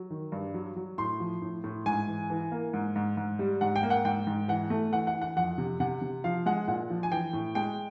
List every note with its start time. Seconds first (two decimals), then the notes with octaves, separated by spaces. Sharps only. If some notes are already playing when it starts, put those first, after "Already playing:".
Already playing: F#3
0.10 D#3
0.32 G2
0.54 F#3
0.76 F#3
0.98 A2 C6
1.20 F3
1.42 A2
1.64 A2
1.86 G#2 G#5
2.08 E3
2.30 E3
2.52 A#3
2.73 G#2
2.96 G#2
3.17 G#2
3.39 G3
3.61 G#2 F#5
3.76 G5
3.83 A#3
3.90 F#5
4.05 G#2 G5
4.27 G#2
4.48 E3 F#5
4.70 A3
4.93 E3 F#5
5.07 F#5
5.14 E3
5.22 F#5
5.36 F2 F#5
5.58 C3
5.80 C3 F#5
6.02 C3
6.24 F3 F5
6.46 G#3 F#5
6.68 A#2 F#5
6.90 F3
7.03 G#5
7.11 E3 G5
7.33 A2
7.55 G#3 G5